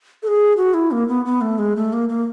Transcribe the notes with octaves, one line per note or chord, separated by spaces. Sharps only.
A4
G#4
F#4
E4
A#3
B3
B3
A3
G#3
A3
A#3
A#3